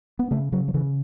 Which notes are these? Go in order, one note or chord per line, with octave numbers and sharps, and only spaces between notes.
B3
C#3 A3
C#3 F#3
F#3
C#3 E3